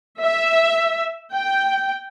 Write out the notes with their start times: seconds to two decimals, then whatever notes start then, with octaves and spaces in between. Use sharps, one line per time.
0.20 E5
1.33 G5